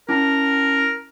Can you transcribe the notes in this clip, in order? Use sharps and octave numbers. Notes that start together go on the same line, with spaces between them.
C#4 E4 A#4 A5